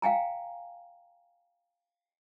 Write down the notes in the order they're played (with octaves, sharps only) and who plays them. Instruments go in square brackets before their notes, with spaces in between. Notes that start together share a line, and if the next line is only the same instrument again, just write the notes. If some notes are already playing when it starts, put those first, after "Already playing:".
[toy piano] F5 G5 G#5 A#5